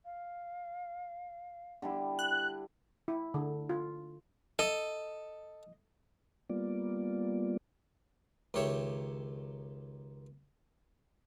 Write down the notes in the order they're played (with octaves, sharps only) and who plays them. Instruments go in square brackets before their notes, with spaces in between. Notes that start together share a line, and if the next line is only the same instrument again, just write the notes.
[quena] F5
[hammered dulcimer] D3 G3 E4
[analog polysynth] F#6
[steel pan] E4
D3
F4
[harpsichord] A4 [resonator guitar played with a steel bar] D#5
[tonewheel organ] G3 A#3 B3 F4 D5
[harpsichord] C#2 D#3 G4 C#5 E5